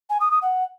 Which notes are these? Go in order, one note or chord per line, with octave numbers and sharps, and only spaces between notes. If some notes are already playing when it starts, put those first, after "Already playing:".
G#5
D#6
D#6
F#5